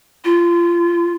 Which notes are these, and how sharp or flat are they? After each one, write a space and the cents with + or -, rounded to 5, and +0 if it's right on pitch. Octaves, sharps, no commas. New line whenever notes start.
F4 -25